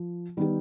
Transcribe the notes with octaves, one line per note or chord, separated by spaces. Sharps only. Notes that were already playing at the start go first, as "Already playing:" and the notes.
Already playing: F3
D#3 G3 B3 D#4 G4